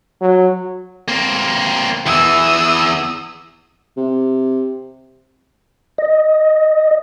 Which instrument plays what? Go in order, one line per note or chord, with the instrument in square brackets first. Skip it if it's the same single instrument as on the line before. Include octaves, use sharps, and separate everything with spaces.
[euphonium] F#3
[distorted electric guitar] A#3 C4
[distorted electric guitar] E2 E3 [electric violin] D#6 E6
[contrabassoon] C3
[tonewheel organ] D#5